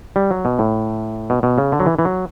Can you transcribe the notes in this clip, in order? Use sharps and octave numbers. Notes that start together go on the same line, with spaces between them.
G3
F#3
B2
A2
B2
B2
C#3
D3
F#3
E3
E3
F#3